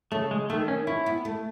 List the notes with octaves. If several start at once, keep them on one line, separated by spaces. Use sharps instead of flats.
C#3 A3
G#3
D#3 A3
C#4
C#4 E4
B3
A3